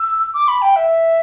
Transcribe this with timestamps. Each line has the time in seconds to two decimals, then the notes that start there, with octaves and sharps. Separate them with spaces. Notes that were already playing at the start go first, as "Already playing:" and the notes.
Already playing: E6
0.33 D6
0.48 B5
0.62 G5
0.76 E5